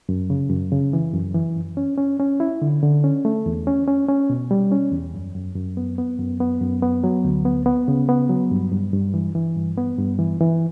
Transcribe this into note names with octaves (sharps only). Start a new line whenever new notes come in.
F#2
C#3
F#2
C#3
E3
F#2
E3
F#2
C#4
C#4
C#4
E4
D3
D3
C#4
A3
E2
C#4
C#4
C#4
B2
G3
C#4
E2
F#2
F#2
F#2
B3
B3
F#2
B3
F#2
B3
F#3
D2
B3
B3
C#3
B3
F#3
G2
G2
G2
E3
E3
G2
B3
G2
E3
E3